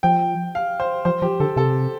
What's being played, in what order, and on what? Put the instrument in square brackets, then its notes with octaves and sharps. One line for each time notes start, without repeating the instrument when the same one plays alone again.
[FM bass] F3 [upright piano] G5
[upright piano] F5
C5
[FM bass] F3 [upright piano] C5
[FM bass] F3 [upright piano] G4
[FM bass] D3 [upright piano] A4
[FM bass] C3 [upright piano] A4